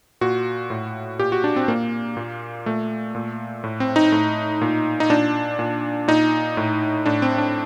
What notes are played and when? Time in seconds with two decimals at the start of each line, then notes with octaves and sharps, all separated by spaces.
0.21 A#2 F#4
0.70 A2
1.19 A#2 G4
1.32 F#4
1.44 D4
1.56 C4
1.68 A#2 A#3
2.17 A#2
2.66 A#2 A3
3.15 A#2
3.64 A2
3.80 C4
3.96 D#4
4.12 A2
4.62 A#2
5.00 D#4
5.10 A#2 D4
5.59 A#2
6.08 A#2 D#4
6.57 A2
7.06 A2 D4
7.22 C4
7.38 D4